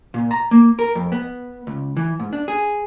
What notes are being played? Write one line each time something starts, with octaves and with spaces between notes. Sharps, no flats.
A#2
A#5
A#3
A#4
F2
B3
C#2
E3
G#2
D4
G#4